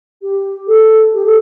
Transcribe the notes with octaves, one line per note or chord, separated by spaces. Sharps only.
G4
A4
G4
A4